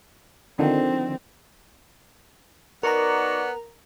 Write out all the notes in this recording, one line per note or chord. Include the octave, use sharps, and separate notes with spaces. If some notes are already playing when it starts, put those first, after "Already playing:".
D3 D#3 F3 C4
B3 D#4 F#4 A#4 D5 A#5